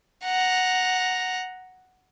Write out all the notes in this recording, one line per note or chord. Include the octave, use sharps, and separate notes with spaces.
F#5 A#5